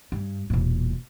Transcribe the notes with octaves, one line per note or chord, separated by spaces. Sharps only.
G2
E1 A#2